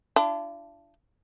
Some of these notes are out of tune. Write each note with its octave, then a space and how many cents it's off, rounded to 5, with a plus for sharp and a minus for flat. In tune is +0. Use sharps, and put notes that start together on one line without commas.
D4 +0 F4 -45 A5 +0